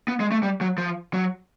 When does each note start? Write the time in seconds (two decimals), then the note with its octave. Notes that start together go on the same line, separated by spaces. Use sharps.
0.08 B3
0.20 G#3
0.32 A3
0.43 G3
0.61 F#3
0.78 F3
1.14 F#3